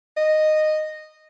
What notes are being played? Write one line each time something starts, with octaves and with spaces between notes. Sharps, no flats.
D#5